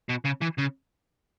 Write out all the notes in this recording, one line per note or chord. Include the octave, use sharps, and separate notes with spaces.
B2
C#3
E3
C#3